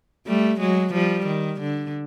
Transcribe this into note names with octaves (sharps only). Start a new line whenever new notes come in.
G3 A3
F#3 G#3
F3 G3
D#3
D3